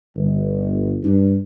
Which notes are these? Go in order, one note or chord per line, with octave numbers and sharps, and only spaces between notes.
G1
G2 D4